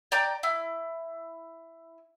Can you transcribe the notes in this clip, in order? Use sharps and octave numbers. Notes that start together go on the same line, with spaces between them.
D5 G5 A#5 G6
E4